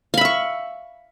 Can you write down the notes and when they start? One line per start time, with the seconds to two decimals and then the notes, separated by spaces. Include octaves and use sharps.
0.14 F5
0.17 B5
0.21 E5
0.25 C#6